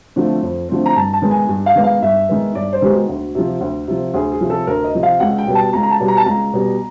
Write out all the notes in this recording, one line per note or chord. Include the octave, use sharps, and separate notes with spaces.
D3 F3 A3 C4
F2
D3 F3 A3 C4
A#5
G2 A5
A5
D#3 G#3 B3
G#5
G2
F5
D#3 G#3 B3
F5
G2 E5
D#3 G#3 B3
G2 D5
C5
D#3 G#3 B3 G4
F#4
D2
C3 F3
D2
C3 F3
D2 G#4
G#4
C3 F3
A4
D2 A#4
D#5
C3 F3
F5
C#2 F#5
G5
B2 G3 B3
A5
C#2 A#5
A#5
A5
B2 G3 B3
A#5
A5
C#2 A#5
B2 G3 B3